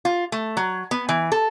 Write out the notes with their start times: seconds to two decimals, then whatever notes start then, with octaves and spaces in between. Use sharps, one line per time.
0.05 F4
0.32 A3
0.57 F#3
0.91 B3
1.09 E3
1.32 A4